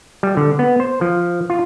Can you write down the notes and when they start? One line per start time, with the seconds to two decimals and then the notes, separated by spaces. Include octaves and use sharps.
0.23 G3
0.37 D3
0.59 B3
0.80 C5
1.01 F3
1.50 F4